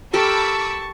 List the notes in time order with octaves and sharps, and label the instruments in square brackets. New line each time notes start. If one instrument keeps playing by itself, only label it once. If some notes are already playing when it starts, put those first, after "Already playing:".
[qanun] G4 A4 A#4 [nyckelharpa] A5 C#6 [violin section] B5 D6 E6